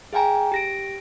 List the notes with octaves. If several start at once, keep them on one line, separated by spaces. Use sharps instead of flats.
G#4 F5 G5 G#5 A#5
G4 A#6 D7